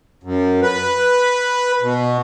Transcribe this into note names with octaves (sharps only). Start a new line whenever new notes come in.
F#2
B4
B2